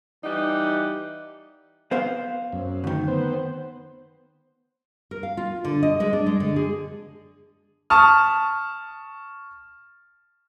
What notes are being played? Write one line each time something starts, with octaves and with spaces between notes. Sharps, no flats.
E3 G3 D#4 F#5
B3 C5 F5
F#2
D2 D#3
B3 C5
A#4
F5
F4
D3
D#5
G#3
D4
G#3
D3
G#4
A5 C#6 D#6 F6